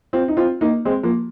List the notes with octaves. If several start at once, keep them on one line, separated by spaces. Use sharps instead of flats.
C4 F4
D#4
C4 F4
A#3 D#4
G#3 C4
F3 A#3